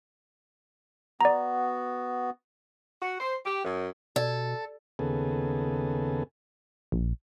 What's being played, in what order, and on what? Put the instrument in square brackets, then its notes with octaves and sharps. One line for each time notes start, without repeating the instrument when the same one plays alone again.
[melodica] B3 F#4 [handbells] D5 A#5
[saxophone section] F#4
C5
G4
F#2
[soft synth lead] B2 [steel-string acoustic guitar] A4 [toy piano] D5
[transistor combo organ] D#2 C#3 B3 G#4 A4
[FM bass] A#1